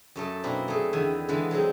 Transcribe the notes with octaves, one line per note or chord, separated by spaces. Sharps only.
F#2 A3 A4 D#5
B2 A#3 C4 D4 E4
A3 G#4
E2 D3 D#3 E4 E5 G#5
D3 E3 G#3 B3 E4
F#3 G#3 C4 D#4